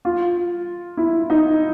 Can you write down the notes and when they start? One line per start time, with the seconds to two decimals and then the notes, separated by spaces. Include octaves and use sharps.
0.05 F4
0.97 E4
1.30 D#4